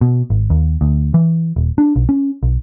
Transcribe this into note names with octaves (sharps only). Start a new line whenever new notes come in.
B2
G#1
D#2
D2
E3
D#1
D4
B1
C#4
B1